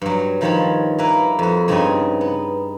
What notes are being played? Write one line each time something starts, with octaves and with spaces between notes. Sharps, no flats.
G2 F#3
G2 D#3 F3 C#5 A5 B5
A#3 E4 A#4 B4
F2 F#4
G2 C#3 C4 D#4 D#5 G#5
B3